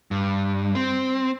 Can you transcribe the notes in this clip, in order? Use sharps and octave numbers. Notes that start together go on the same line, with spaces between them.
G2
C4